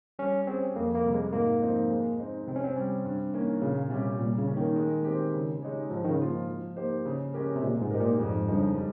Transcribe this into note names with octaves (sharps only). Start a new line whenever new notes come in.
G3 C#4
C4 C#4 G#4
F2 A#3
A#3
C3 G3 C4
G#3
G#2 A#3
F3 C4 D#4
G#3
C4 D#4
C3 C4
C#4
C4
G3 C#4
G2
D#3 A#3 C#4
A#2 C#3
C3 G3 C#4 G4
A#2 G3
C#3
A#3 C#4
D#3
G#3
C4 G4
C#3
G#3 D#4 G4 C#5
G#2 F3
D#3
C#3
F3 A#3 F4
F3
A#3 D#4 G4 C5
C#3
G#3 C#4 G4 A#4
C3
A#2 G#3
G#2
D#4 G4 A#4
A#2
F2 G#2
G2 C#3 F3 G#3 D#4
G3